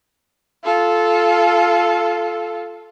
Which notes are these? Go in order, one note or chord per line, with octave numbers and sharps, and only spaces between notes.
F4 A4